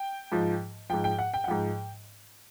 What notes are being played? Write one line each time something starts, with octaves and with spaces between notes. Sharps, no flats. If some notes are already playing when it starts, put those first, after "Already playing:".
Already playing: G5
G#2 F3
G#2 F3 G5
G5
F#5
G5
F#5
G#2 F3 G5